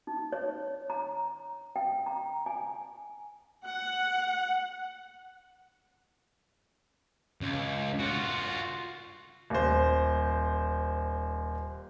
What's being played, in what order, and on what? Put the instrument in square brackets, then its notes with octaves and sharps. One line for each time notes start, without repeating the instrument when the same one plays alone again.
[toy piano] D#4
C#5
A#5
G5
A#5
G#5
[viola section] F#5
[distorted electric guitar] C#2
F4 F#4
[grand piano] D#1 C5